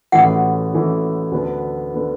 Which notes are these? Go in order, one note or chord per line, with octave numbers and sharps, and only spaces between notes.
A1 A2 E3 A3 F#4 F#5
A1 A2 E3 A3 F#4
D2 D3 B3
D3 B3